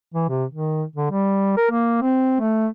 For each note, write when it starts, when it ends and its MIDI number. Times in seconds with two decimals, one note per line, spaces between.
0.14 0.27 52
0.29 0.45 48
0.51 0.83 51
0.96 1.10 50
1.11 1.57 55
1.57 1.69 70
1.71 1.97 58
2.02 2.39 60
2.40 2.67 57